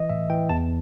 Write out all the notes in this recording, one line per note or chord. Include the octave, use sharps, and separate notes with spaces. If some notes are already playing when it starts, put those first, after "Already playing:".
Already playing: E3 D#5
A2 E5
E3 G5
E2 A5